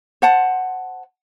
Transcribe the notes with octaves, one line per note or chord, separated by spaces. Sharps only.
C5 F#5 A5